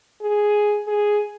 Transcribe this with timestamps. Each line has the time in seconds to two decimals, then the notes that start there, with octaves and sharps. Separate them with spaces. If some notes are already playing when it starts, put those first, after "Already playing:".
0.21 G#4
0.88 G#4